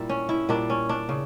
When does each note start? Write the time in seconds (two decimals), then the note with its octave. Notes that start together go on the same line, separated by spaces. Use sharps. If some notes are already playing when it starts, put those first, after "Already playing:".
Already playing: G2 A#2 G3 E4
0.09 C#4
0.29 E4
0.49 A#2 G3 D4
0.70 C#4
0.89 D4
1.09 C#3